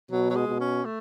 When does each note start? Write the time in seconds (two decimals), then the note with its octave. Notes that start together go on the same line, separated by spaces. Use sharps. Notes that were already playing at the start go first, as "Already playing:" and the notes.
0.11 B2 F#3
0.30 F#3
0.36 G#3
0.48 B2
0.60 C#4
0.85 A3